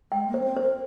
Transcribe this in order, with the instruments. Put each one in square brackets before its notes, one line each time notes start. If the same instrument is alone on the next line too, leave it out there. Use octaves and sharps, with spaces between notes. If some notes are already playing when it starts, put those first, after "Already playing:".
[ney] G#3 [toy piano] G5
[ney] A#3
[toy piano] C5
[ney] C#4
C4
[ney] A#4 [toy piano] C5